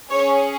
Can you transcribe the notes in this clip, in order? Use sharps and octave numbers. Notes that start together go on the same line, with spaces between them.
C#4 G#4 C#5